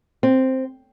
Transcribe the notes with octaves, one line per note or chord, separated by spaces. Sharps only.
C4